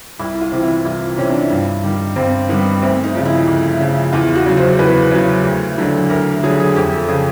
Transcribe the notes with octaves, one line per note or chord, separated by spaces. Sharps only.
C2 E4
F4
C3 E3
E4
C2 F4
C3 E3 C#4
D4
G2
D#3 G3
G2 C4
D#3 G3 B3
D2 C4
D#4
C#3 F3
E4
D2
C#3 F3
E2 F4
F#4
C#3 F#3
C5
E2 B4
C#3 F#3
D2
D3 F#3
D2 A#4
D3 F#3 G#4
G#4
F2 G4
A4
C#3 F3 G#4